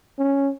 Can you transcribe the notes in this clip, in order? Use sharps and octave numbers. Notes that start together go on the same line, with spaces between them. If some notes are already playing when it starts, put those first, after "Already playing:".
C#4